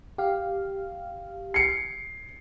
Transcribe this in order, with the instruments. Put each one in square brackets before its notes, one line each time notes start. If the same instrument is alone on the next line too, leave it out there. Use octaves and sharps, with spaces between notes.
[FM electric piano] G4 F5
[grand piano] C7 C#7